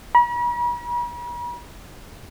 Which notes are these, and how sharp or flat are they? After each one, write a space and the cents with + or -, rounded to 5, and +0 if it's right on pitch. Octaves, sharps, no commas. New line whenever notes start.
B5 -45